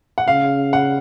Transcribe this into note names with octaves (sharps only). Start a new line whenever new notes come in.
F#5
C#3 F5
F#5